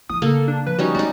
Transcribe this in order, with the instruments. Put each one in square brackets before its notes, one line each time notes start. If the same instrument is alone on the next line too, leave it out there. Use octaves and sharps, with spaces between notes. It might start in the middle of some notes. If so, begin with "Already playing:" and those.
[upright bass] F3 E4 [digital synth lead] D#6
[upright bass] C#3 [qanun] A#3 [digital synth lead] A4
[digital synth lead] D4
[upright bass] F3 [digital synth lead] B4
[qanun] G3 C#4 D#4 [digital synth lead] F#4
[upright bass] G#3 [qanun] D#4 F#4 [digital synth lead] D5